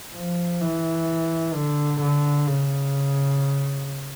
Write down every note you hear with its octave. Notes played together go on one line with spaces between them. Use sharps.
F3
E3
D3
D3
C#3